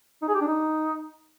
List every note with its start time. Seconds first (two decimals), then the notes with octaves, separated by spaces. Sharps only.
0.22 D#4
0.28 G#4
0.34 G4
0.41 D4
0.47 D#4